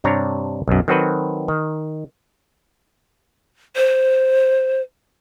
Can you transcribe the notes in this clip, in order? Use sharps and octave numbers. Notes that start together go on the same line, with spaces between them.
G2 C3 D4 C#5 A#5
B1 F#2
D#3 F#3 C4 F#4 A4 B4
D#3
C5